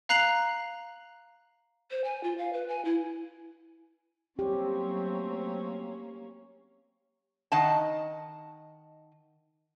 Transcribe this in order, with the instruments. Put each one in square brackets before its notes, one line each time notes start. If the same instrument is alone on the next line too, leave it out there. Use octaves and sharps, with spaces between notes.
[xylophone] F5 A#5 F#6 C7 F7 F#7
[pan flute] C5
G#5
F4
F5
B4
G#5
E4
[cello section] F#3 A3 [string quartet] A#3 C#4 [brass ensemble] C4 [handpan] G4
[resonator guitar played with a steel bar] D#3 D#5 F#5 A5